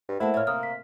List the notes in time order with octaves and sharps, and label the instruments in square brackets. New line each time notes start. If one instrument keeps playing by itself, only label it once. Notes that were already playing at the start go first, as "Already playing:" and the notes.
[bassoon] G2
[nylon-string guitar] A3 A#3 [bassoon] E4 [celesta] C5 F#5 A5
[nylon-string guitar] A#2 C#5 [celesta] E5 F6
[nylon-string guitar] C3 [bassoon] A#3 [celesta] D#6 F6
[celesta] B6